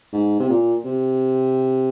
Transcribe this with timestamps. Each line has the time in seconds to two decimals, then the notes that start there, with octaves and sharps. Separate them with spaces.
0.13 G#2
0.40 C3
0.49 A#2
0.85 C3